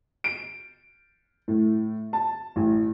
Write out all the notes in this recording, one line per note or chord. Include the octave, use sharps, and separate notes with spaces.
D7
A2
A5
A1